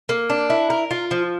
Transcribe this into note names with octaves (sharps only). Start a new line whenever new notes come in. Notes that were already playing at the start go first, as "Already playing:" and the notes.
A#3
D4
E4
A#4
F4
F3